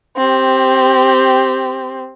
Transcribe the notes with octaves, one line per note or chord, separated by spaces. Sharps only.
C4 G4